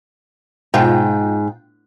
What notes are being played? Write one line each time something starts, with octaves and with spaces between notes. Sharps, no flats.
G#2 B2 F4 G5